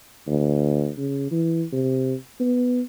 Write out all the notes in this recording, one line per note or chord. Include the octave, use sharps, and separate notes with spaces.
D2
C#3
E3
C3
B3